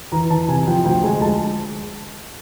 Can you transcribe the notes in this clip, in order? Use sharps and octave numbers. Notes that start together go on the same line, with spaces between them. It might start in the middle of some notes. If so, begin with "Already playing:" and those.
E3 A#5
E3 A5
C3 G#5
F3 G5
D2 G5
G#3 G#5
G#3 A5